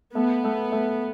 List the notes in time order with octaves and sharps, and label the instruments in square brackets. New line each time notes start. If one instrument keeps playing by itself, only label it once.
[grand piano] A3 [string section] B3
[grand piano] A3
A3